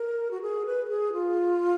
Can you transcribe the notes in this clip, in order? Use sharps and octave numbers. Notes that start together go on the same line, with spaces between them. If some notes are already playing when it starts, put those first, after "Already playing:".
Already playing: A#4
F#4
G#4
B4
A#4
G#4
F4